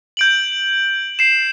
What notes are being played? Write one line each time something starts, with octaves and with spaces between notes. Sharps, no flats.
G6 D7 F#7
C7 E7